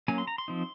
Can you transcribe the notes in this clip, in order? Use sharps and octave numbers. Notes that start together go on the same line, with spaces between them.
F#3 A#3 C#4 G#5
C6
A#5
C6
F3 C4 D#4